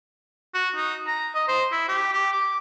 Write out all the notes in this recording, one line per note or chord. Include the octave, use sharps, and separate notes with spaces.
F#4
D#4
A#5
D#5
C5
E4
G4
G4
D6